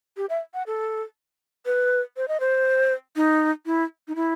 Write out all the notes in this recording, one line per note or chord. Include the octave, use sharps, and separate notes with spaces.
G4
E5
F#5
A4
B4
C5
D#5
C5
D#4
E4
D#4
E4